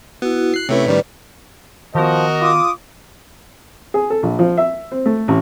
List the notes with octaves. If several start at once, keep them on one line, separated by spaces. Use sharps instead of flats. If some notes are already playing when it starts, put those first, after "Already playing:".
B3 E4 F#4
F#6 C7
C3 A3 C#4 E4 B4 C#5
A2 D#3 G3 B4 D5
D#3 F3 B3 F#4 A#4 D#5
F4 D6 D#6
G#4
A4
A#1
F3
E5
C4
A3
A1